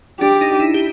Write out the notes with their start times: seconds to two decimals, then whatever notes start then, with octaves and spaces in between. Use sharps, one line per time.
0.21 D4 G4
0.41 D#4
0.60 E4
0.74 G4